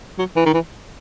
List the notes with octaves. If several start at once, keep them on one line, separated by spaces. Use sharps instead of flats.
F#3
E3
D#3
E3